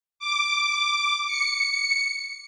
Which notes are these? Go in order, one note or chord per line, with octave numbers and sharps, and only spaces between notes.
D6
C#7